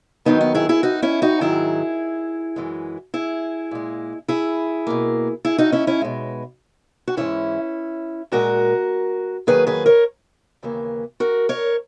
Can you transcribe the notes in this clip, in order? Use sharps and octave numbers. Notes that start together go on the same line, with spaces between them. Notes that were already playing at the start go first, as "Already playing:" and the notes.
D#2 D#3 F#3 B3 D#4
B3
E4 G#4
E4 G#4
D#4 F#4
C#4 E4
D#4 F#4
G#2 D#3 F#3 E4 G#4
F#2 E3 G#3
E4 G#4
A#2 G#3
E4 G#4
B2 A#3
E4 G#4
D#4 F#4
C#4 E4
C#4 E4
B2 G#3
F#4
G#2 E3 G#3 C#4 E4
A#2 G#3 F#4 A#4
E2 D#3 F#3 A#3 G#4 B4
G#4 B4
A#4 C#5
D#2 C#3 E3 A#3
F#4 A#4
A#4 C#5